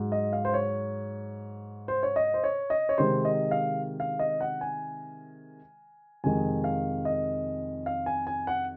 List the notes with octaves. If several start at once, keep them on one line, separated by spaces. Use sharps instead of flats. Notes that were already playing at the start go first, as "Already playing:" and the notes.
Already playing: G#2 F#3
D#5
F5
C5
C#5
C5
C#5
D#5
C5
C#5
D#5
C#5
C3 D#3 G#3 C5
D#5
F5
F5
D#5
F#5
G#5
F2 C3 D#3 G#3 G#5
F5
D#5
F5
G#5
G#5
F#5